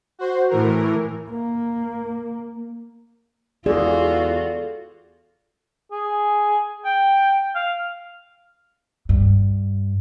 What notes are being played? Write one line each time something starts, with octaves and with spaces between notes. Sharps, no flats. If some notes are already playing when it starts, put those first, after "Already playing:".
F#4 C5
A2 E3 A#4
A#3
E2 F4 F#4 G#4 A4 D5
G#4
G5
F5
G2